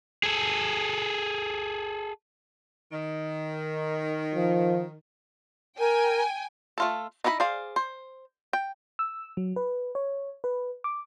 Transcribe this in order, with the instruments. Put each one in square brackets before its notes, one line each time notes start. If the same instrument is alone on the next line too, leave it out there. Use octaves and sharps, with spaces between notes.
[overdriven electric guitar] G#4 A4
[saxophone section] D#3
[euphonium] F3
[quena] A#4 [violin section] G5 G#5
[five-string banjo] A3 F4 A4
D#4 E4 D#5 G5 B5
G#4 C5 D5 F5
C5
G5
[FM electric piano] E6
F#3
B4
C#5
B4
D6